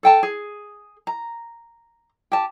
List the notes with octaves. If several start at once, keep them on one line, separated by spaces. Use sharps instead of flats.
A4 G5 A5
G#4
A#5
G4 A5